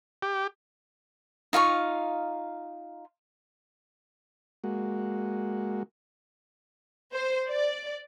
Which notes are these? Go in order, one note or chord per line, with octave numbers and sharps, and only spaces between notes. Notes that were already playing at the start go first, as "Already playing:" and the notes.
G4
D#4 F4 F5 C#6
G#3 A#3 F#4
C5
D5